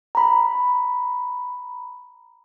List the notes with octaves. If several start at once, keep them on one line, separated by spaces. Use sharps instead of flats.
A#5 B5